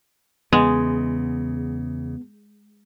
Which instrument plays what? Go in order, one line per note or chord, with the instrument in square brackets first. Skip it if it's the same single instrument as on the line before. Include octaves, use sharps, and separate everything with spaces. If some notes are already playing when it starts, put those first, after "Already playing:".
[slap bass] E2 C#3 [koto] G#3 [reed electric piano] B3